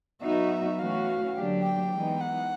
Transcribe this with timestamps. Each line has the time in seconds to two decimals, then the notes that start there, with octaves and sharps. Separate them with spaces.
0.22 F#3 B3 D#4 F#4 E5
0.79 E3 A3 C#4 F#4 F5
1.35 D3 F#3 A#3 D4 G4
1.63 G5
1.92 E3 G#3 B3 D#4
2.20 F#5